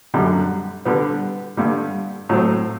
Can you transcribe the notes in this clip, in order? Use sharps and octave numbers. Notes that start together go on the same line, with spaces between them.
F#2 D3 G3
D3 G3 B3
G2 D3 G3
A2 F#3 A3 C4